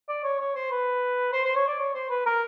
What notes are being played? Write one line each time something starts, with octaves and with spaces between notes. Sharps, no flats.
D5
C#5
C#5
C5
B4
C5
C5
C#5
D5
C#5
C5
B4
A#4